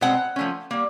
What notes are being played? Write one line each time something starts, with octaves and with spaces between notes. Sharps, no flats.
B2 G#3 C4 F#5
F3 A3 C#4
G3 A#3